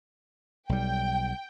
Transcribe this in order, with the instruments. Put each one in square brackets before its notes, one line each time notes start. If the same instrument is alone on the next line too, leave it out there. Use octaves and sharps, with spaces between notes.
[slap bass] B1 G3 [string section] G5